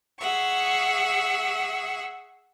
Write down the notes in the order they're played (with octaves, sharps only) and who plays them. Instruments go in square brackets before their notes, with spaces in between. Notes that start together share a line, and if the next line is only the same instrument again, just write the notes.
[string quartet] G#4 E5 F#5 C#6